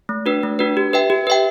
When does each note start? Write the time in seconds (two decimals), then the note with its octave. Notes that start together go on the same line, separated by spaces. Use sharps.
0.09 A3
0.26 D4 F#4 B4
0.43 A3
0.59 D4 F#4 B4
0.77 G4
0.93 B4 E5 G5
1.10 G4
1.27 B4 E5 G5